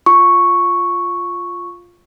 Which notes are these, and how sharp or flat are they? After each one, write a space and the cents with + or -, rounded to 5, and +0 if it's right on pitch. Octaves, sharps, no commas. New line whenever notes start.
F4 +0 C#6 +0